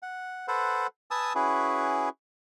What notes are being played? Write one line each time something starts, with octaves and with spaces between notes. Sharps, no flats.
F#5
A4 B4 C5 F#5
B4 G#5 A5 D#6 E6
C#4 E4 F#4 G#4 B4